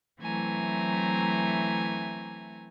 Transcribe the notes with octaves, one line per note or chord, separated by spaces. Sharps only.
E3 F#3 A3 C4 G#5 A#5